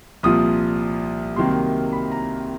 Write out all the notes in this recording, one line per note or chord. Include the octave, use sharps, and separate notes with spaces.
C2 A#2 F3 D#6
C2 C3 D#3 F#3 A#3 C6
B5
A#5